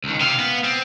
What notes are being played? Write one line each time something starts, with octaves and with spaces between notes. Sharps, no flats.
C#2 D#3
C3 F5
B3
C4